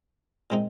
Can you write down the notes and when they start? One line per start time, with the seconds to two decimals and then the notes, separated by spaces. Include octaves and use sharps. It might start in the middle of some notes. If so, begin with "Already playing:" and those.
0.50 A#2 G#3 C4 D#4